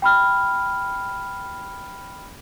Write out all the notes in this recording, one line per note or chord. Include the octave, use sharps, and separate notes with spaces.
G5 B5 F6